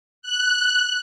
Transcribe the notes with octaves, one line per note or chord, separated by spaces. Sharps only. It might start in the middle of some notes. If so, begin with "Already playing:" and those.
F#6